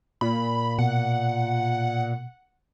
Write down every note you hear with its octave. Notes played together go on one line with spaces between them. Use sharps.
A#2 B5
B2 F#5